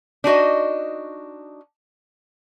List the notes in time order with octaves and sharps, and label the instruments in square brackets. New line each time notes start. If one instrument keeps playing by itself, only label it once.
[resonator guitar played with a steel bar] D4 D#4 F#4 D#5